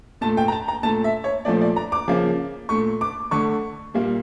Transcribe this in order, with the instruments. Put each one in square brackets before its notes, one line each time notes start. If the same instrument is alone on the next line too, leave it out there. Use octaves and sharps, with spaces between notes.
[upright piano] A#2 A3 A5
G5
A#5
A5
A#5
A#2 A3 A5
E5
C#5
A#2 F3 A3 D5
D5
A#5
D6
C#3 F3 A#3
A#2 A3 C#6
D6
D3 A3 C#6
A#2 G3 A#3